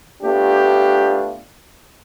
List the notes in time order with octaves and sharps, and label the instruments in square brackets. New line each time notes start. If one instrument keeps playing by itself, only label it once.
[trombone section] A3 B3 D4 F4 G4